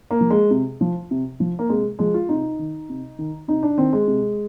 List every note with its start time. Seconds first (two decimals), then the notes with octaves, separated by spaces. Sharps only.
0.11 A#3
0.21 F3
0.30 G#3
0.51 C3
0.81 F3
1.11 C3
1.40 F3
1.59 A#3
1.69 C3 G#3
1.99 F3 G#3
2.14 F4
2.29 C3 D#4
2.59 D#3
2.89 C3
3.19 D#3
3.48 C3 D#4
3.63 D4
3.77 D#3 C4
3.93 G#3
4.08 C3